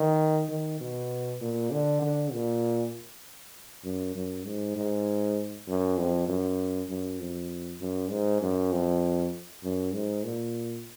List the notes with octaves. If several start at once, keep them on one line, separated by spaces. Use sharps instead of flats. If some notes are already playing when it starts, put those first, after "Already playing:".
Already playing: D#3
D#3
B2
A#2
D3
D3
A#2
F#2
F#2
G#2
G#2
F#2
F2
F#2
F#2
F2
F#2
G#2
F#2
F2
F#2
G#2
A#2